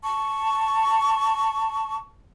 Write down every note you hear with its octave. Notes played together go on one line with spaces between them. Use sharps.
A5 C#6